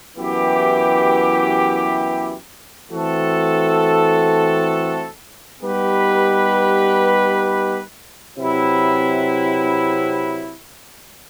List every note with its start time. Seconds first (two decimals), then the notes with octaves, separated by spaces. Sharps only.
0.16 F#2 E3 B3 E4 G4
2.89 E3 A3 C4 F#4 A4
5.62 G3 B3 D#4 G4 B4
8.35 C3 F#3 C4 E4 B4